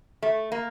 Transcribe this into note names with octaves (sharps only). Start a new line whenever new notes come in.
A3
A#3